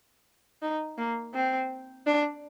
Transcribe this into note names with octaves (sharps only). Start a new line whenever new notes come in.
D#4
A#3
C4
D4